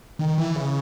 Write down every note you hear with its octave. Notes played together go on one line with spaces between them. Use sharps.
D#3
E3
C#3